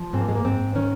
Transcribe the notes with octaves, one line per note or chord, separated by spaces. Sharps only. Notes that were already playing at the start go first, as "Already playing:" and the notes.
Already playing: F3
G#2 C4
A#3
G#3
A#3
G#2 C4
D#3 C#4